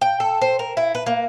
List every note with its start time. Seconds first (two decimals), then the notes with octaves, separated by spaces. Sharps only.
0.01 G5
0.20 A4
0.41 C5
0.59 A#4
0.77 E4
0.95 B4
1.06 A#3